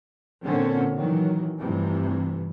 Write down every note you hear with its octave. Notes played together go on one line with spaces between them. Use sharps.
A#2 D3 C4 C#4
D#3 E3 F#3
F1 G2 C3 E3